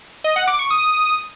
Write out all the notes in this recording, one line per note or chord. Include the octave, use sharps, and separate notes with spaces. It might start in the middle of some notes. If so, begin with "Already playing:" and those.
D#5
F#5
D6
C#6
D#6